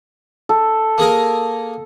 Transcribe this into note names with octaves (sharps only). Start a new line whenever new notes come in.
A4
A#3 G#4 A#4